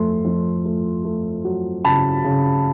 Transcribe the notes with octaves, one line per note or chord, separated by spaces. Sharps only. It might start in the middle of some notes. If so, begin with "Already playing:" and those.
Already playing: F2 A3 C6
F2
A3
A3
F#3
C#3 A5 B5
C#3